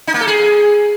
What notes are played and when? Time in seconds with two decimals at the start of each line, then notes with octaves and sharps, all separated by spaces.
0.07 D#4
0.14 A#3
0.21 A4
0.27 G#4